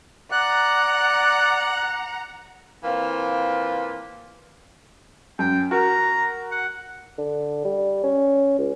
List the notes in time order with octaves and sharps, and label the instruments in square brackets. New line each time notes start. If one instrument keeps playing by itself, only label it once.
[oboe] D5 [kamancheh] F#5 A#5 [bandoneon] F#6
[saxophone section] E3 A#3 C4 F4
[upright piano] F#2 [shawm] G5
[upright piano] F#4 A#4 [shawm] A#5
[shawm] F#5
[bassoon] D3
G3
C#4
C#2